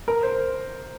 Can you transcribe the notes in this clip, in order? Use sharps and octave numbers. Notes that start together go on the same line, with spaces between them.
A#4
C5